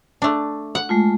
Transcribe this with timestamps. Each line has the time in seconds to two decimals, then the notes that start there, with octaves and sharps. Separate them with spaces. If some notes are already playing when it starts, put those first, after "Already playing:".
0.22 A3 D4
0.75 F#5
0.89 G#3 A3 F4